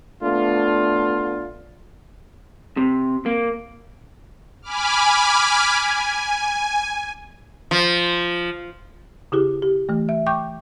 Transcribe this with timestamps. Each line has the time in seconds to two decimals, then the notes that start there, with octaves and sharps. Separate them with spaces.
0.22 A3 B3 D4 F4
2.77 C3
3.26 A#3
4.62 G#5 B5 D6 F6
5.78 G#5
7.71 F3
9.32 C#3 E4 G4 G#4
9.62 G4
9.89 E3 A3
10.09 E5
10.26 G5 C#6 D6 G6